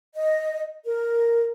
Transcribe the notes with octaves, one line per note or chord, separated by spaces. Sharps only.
D#5
A#4